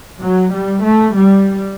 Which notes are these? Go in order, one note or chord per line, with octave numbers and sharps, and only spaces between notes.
F#3
G3
A3
G3